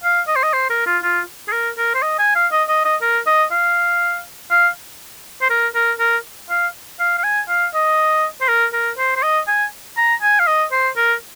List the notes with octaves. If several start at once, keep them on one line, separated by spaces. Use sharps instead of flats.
F5
D#5
C5
D#5
C5
A#4
F4
F4
G#4
A#4
A#4
C5
D#5
G#5
F5
D#5
D#5
D#5
A#4
D#5
F5
F5
C5
A#4
A#4
A#4
F5
F5
F5
G#5
F5
D#5
C5
A#4
A#4
C5
C5
D#5
G#5
A#5
G#5
F5
D#5
C5
A#4